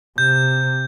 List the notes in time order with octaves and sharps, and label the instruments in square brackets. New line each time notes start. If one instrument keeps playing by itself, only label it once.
[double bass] C3 [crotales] G6